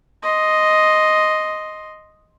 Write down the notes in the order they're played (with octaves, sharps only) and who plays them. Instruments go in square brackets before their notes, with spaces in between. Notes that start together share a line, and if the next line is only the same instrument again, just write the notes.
[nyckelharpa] D#5 C6